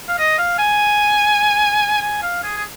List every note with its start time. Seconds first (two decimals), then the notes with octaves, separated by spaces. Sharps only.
0.08 F5
0.18 D#5
0.38 F5
0.58 G#5
2.02 G#5
2.22 F5
2.43 G#4
2.57 G#4